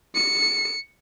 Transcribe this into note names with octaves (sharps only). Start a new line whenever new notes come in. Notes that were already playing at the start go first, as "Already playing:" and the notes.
C#7